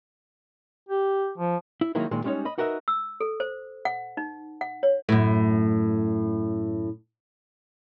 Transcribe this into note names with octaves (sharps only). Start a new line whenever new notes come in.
G4
F3
E4
D#3 F#3 G#3 A#3 D#4 E4
A#2 D#3 G#3
G3 G#3 C#4 D#4 C#5
D#5 B5
D#4 F#4 A#4 B4 D#5 E5
E6
A4
C5
F#5
D#4
F#5
C#5
F#2 A2